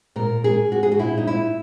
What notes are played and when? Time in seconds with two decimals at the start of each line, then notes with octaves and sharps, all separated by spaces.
0.16 A#2 A#4
0.44 G#4
0.72 F#4
0.83 G#4
0.92 F#4
0.99 A#2 E4
1.18 D#4
1.27 E4